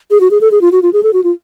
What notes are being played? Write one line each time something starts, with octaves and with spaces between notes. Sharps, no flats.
G#4
F#4
G#4
A4
G#4
F4
F#4
F4
G#4
A4
F#4
F4